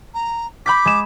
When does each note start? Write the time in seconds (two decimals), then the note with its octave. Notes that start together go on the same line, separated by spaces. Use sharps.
0.14 A#5
0.66 B5 D6 G6 B6
0.85 G#3 E7